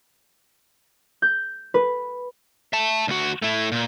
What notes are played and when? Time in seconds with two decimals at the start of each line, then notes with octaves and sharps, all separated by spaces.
1.22 G6
1.74 B4
2.73 E5 A5
3.08 D2 F#4
3.42 A3 E4
3.72 A#2